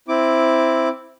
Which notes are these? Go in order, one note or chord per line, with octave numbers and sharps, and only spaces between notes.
C4 E4 D6